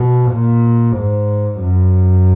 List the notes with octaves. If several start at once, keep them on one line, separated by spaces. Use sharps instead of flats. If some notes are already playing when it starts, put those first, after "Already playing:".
Already playing: B2
A#2
G#2
F#2